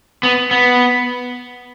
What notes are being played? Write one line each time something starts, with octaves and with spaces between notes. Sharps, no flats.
B3
B3